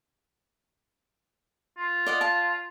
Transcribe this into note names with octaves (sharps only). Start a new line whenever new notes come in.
F4
D5 D#5 F#5
F5 A5